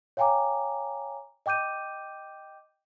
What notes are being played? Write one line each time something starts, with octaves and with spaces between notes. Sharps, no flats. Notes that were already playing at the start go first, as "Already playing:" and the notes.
C#5 F5 G5 G#5 A#5 D6
D#5 G5 D6 G6 D#7